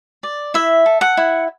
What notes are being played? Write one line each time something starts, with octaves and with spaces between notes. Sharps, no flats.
D5
E4 E5
A4
F#5
E4